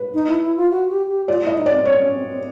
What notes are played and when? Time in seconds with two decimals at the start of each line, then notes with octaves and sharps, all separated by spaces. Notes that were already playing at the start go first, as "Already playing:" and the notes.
Already playing: B4
0.14 D#4
0.28 E4
0.42 E4
0.57 F4
0.71 F#4
0.90 G4
1.08 G4
1.28 F4 D5
1.42 E4 D#5
1.56 D#4
1.66 D5
1.70 C4
1.85 C4 C#5
2.00 C#4
2.14 C4
2.28 C4